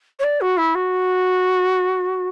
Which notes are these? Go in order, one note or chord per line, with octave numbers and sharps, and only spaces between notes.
C#5
D5
F#4
E4
F#4